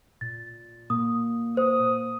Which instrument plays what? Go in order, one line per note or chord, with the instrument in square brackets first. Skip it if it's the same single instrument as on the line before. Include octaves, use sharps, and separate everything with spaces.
[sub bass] A#2 [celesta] A6
[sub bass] A#2 [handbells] A#3 [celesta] D#6
[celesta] C5 [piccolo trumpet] D#6